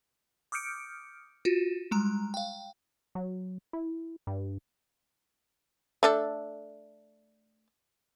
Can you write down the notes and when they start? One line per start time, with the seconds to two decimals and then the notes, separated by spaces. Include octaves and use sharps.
0.52 D6 D#6 F6 G6 C#7 D7
1.45 F4 F#4
1.91 G3 G#3 A#5
2.34 F5 G5
3.15 F#3
3.73 E4
4.27 G2
6.03 A3 D4 A4